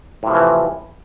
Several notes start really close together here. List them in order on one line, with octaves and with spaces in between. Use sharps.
A2 C3 F3 E3